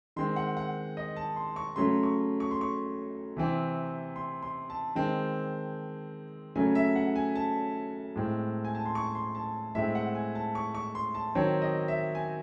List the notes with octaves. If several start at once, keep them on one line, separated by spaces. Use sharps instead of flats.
D#3 G#3 C4 C6
F#5
F#5
D#5
A5
C6
C#6
C#3 F#3 A3 C6
C#6
C#6
C6
C#6
C3 E3 C4
C6
C6
A5
D#3 G#3 C4
C#3 F#3 A3 G#5
E5
F#5
G#5
A5
A2 G#3 C4
G#5
A5
C6
C#6
C6
A5
A2 G#3 C4 E5
F#5
G#5
A5
C#6
C#6
C6
A5
D#3 F#3 C4 C#5
D#5
E5
G#5